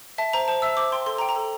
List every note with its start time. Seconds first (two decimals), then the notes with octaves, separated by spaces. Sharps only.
0.18 E5 A5
0.33 C5 A#5
0.48 C5 A5
0.62 E5 E6
0.77 C5 D6
0.92 G5 C6
1.06 A4 C6
1.18 A#5
1.21 G5
1.29 A#5
1.36 A4